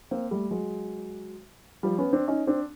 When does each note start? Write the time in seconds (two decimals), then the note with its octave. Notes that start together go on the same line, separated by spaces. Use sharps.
0.11 A#3 C4
0.31 G3 A3
0.51 F#3 G#3
1.83 F3 G3
1.98 B3 C#4
2.13 C4 D4
2.28 C#4 D#4
2.47 C4 D4